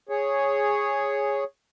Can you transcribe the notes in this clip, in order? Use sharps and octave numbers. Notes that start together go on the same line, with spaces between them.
G#4 C#5